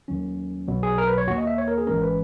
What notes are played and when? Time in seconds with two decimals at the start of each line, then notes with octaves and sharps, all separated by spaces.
0.08 D#2 D#3 F#3 C#4
0.68 B1 B2 F#3
0.83 G#4
0.98 A#4
1.07 B4
1.18 C#5
1.27 D#2 D#3 A#3 F#4
1.38 D#5
1.47 E5
1.58 C#5
1.68 A#4
1.78 G#4
1.87 G#1 G#2 E3 G#3 C#4 A#4
2.02 B4